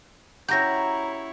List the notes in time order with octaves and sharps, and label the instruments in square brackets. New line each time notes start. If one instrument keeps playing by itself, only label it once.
[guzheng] C#4 F#4 G4 [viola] E4 C#5 [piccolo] A#5 [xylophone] G6 A#6